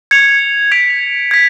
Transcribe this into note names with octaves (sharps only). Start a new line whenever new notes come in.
G#6 C#7 F7
G#6 B6 D7 F7
G#6 B6